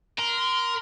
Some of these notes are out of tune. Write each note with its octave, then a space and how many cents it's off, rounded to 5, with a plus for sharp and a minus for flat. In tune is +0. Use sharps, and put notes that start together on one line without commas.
A#4 +15 C6 -25